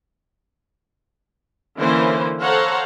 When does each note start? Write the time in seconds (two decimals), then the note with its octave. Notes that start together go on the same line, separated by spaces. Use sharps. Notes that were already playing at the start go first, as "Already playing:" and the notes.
1.78 D3 E3 A#3 C#4 E4 C5
2.42 A4 C5 C#5 F5 F#5 A#5